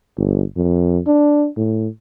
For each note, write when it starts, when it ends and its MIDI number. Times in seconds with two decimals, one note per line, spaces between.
0.17 0.43 31
0.57 0.99 41
1.07 1.47 62
1.57 1.88 45